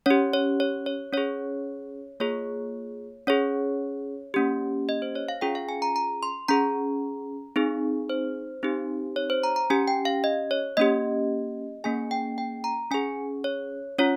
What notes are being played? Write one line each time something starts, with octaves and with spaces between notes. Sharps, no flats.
C#4 G4 C#5
C#5
C#5
C#5
C#4 G#4 C#5
A#3 F4 G#4 C#5
C#4 G#4 C#5
A#3 C#4 G4
D#5
C5
C#5
F5
C#4 F4 G#4 G5
F5
G#5
A#5
A#5
C6
C#4 G#4 A#5
C4 D#4 G#4
C5
C4 D#4 G4
C#5
C5
A#5
A#5
C#4 G4 G#5
G5
F5
D#5
C#5
A#3 C#4 G4 D#5
A#3 C#4 G#4 G#5
G5
G5
A#5
C#4 G#4 G#5
C#5
C#4 F4 C#5